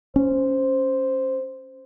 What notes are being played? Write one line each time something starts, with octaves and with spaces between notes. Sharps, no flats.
C#4 C5